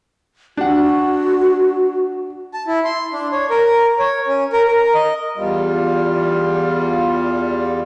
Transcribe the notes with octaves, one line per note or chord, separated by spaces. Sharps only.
D4 F#4 F#5
A5
E4
C6
D4
C#5
A#4
C#5
C#4
A#4
A#4
D#5
E2 G3 F4